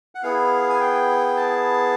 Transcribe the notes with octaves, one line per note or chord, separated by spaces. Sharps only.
F#5
B3 E4 G#4 F5
G#5
G5
A5